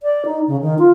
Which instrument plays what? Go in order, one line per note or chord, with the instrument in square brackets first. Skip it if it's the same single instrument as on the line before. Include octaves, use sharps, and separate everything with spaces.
[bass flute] D5
D#4
C#3
D#3
F4